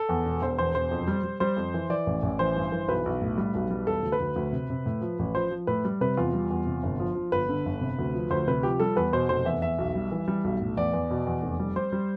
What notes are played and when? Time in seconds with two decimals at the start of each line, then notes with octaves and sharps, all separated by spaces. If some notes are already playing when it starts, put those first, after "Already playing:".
Already playing: A4
0.09 E2
0.25 E1
0.42 E1 C5
0.58 E2 C5
0.75 E1 C5
0.91 F2
1.08 G3
1.24 G3
1.40 G3 C5
1.57 F2
1.74 E3
1.90 E3 D5
2.07 A1
2.23 A1
2.39 E3 C5
2.56 G2
2.72 E3
2.88 B1 B4
3.06 B1
3.22 A2
3.38 G3
3.55 B1
3.71 G3
3.87 E1 A4
4.03 D2
4.12 B4
4.20 D2
4.36 D2
4.53 C3
4.70 C3
4.86 A2
5.02 F3
5.19 A1
5.35 F3 C5
5.51 F3
5.67 A2 B4
5.85 G3
6.01 C3 B4
6.17 E2 F4
6.33 G3
6.50 E2
6.66 C3
6.83 G1
7.00 F3
7.15 F3
7.32 G1 B4
7.49 D3
7.66 G1
7.81 C3
7.99 D2
8.14 F3
8.31 D2 C5
8.47 C3 B4
8.63 F3 G4
8.80 G3 A4
8.96 E2 B4
9.13 B2 C5
9.29 F1 C5
9.45 E2 E5
9.62 E2 E5
9.78 B1
9.95 G3
10.12 E3
10.28 G3
10.44 B1
10.61 A2
10.77 E2 D5
10.93 E2
11.10 B2
11.27 E2
11.42 F1
11.60 G3
11.76 G3 C5
11.92 G3